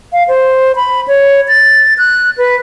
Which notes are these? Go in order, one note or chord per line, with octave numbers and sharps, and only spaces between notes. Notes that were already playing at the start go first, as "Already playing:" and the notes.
F5
C5
B5
C#5
A6
F#6
B4